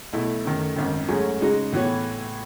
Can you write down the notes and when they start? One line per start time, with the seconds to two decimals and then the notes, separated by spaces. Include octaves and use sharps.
0.13 B1 B2 A3 E4
0.45 F#2 D#3 A3
0.76 G#1 F#2 D#3
1.08 G#2 F#3 A3 C#4 G#4
1.41 C#3 G#3 D#4 F#4
1.72 A2 E3 B3 F#4 C#5